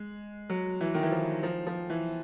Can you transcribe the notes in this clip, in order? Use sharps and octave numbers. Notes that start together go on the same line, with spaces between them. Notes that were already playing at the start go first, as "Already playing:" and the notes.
Already playing: G#3
F#3
E3
D#3
E3
F3
F3
F3
E3